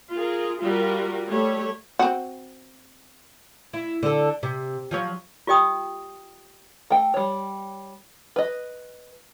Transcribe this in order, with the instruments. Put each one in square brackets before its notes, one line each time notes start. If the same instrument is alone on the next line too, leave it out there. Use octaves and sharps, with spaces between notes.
[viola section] F4 G#4 A#4
G3 F4 F#4 A#4
G3 A3 C#5
[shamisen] C4 F#4
[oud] E4
D3 A4
C3
F3 F#3 C#5
[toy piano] F4 G4 D#5 G5 D#6
[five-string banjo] A3 G5
G3 C#5
B4 D#5